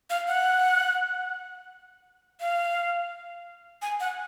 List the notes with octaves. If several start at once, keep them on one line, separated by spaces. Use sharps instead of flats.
F5
F#5
F5
G#5
F#5